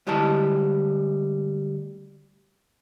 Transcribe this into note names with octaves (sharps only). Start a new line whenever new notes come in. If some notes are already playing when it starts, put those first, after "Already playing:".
D2 G3 G#3 E4 A5